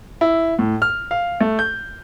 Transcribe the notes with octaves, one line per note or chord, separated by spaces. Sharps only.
E4
A2
F6
F5
A3
G6